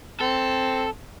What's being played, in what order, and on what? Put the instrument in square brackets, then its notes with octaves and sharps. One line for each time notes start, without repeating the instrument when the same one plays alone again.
[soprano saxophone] C4 [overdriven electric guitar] A4